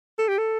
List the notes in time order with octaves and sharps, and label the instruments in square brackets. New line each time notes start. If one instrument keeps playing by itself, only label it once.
[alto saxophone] A4
G4
A4